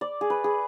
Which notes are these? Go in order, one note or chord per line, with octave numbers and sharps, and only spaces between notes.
D5
G#4
B4
G#4